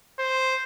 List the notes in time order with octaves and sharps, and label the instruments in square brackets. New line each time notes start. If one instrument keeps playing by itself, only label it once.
[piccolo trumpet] C5